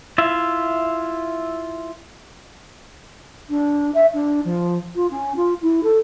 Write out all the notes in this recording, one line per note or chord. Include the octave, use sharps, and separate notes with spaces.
E4 F4 E5
D4
E5
D4
F3
F4
C#4
F4
E4
A4